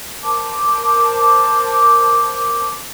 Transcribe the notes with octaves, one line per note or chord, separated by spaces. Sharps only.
A#4 C5 A5 D6